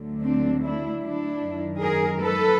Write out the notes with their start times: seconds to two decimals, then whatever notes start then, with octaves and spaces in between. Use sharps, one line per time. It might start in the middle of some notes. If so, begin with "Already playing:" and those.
Already playing: D2 D3 F#3 A3
0.22 C4 D4
0.62 D4 E4
1.02 D4 E4
1.42 F#2 D#3 F#3
1.81 G#4 A#4
2.21 A4 B4